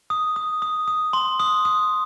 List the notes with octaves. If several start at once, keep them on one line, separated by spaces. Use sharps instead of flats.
D#6
D#6
D#6
D#6
C6
D#6
D#6